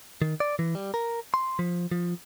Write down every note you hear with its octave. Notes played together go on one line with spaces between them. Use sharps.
D#3
D5
E3
G3
A#4
C6
F3
F3